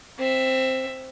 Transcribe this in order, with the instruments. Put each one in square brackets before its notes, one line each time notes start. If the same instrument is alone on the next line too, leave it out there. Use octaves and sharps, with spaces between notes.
[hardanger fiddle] C4 E5